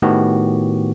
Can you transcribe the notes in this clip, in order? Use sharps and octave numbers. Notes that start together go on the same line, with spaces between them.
A2 D#3 B3 F#4 G4